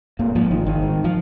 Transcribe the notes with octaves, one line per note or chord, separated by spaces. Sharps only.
G#2 A#3
G#2 F3
G#1 D#3
G#1 D#3
G#2
F3